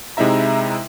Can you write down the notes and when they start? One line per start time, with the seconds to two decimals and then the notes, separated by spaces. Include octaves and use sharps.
0.17 C3 G#3 D#4 E4 E5 A#5